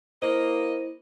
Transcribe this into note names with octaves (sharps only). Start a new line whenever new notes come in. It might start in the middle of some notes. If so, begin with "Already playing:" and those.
A#3 E4 C5 D#5 D#7